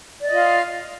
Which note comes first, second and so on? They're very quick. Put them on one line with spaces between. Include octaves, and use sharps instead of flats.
D5 D#5 F4 F5